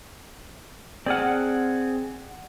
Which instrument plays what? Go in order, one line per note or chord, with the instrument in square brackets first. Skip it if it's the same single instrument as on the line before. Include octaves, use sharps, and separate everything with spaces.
[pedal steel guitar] C4 G#4 F6 [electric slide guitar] D5 F#5